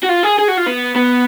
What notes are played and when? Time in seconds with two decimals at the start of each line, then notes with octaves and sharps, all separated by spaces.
0.03 F#4
0.09 F4
0.23 G#4
0.39 G#4
0.49 F#4
0.58 F4
0.67 B3
0.96 B3